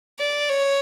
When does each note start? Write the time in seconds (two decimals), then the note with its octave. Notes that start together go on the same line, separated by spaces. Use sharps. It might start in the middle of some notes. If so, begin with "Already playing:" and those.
0.20 D5
0.49 C#5